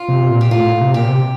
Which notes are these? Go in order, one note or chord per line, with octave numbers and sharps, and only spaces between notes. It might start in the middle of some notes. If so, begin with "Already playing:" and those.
Already playing: F4
C3
A#2
G4
A2 F4
A2
C3
A#2 G4
C3